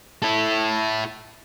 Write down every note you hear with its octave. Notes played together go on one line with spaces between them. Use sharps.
E4 A4